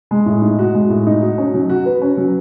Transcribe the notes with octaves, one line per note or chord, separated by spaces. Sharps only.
G#3
A2
D#4
F#4
G#3
A2
D#4
F#4
C#4
F#3
F#4
B4
C#4
F#3